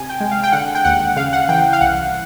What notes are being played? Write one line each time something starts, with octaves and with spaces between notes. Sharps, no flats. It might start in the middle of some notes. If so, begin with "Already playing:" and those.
Already playing: C3 G#5
G5
G#3
F5
G5
D3 F#5
G5
D#2 F#5
C#3 F5
F#5
E3 G5
F5
C2 F#5